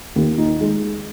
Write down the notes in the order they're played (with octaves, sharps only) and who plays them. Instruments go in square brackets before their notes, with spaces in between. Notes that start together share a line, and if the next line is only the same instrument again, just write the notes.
[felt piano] D#2
D#4
G#3